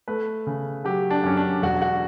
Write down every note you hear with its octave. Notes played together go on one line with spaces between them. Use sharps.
A3 B4
C#3
F#3 G4
D4
F#2 C#4
D4
E1 F#4
F#4